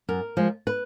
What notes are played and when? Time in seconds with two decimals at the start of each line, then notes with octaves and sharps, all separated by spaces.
0.09 F#2 A#4
0.37 F3 G#3
0.67 B4